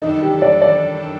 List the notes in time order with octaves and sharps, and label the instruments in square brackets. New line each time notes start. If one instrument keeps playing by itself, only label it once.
[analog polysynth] F#2 D#3 G3 D4 A4 [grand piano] D#4
[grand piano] G4
D5
D5